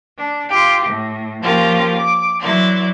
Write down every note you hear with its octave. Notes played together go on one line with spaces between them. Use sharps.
D4
F4 G4
A2
F3 A#3 C#4 F4 G4 A#4
D6
E3 F#3 E4 D5 C6